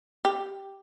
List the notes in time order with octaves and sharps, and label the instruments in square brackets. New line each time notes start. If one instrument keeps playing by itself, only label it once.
[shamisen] G4